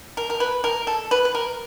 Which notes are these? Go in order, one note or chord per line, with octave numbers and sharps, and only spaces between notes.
A#4
A#4
B4
A#4
A4
B4
B4
A#4